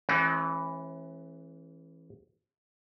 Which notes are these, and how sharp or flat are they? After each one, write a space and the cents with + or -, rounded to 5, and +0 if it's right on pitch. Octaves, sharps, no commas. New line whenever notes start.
E3 +0 A3 -45 C#4 -45